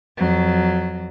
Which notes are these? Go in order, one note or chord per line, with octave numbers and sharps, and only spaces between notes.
F2 F#3